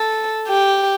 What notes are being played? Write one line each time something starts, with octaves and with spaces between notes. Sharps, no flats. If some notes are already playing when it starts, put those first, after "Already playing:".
Already playing: A4
G4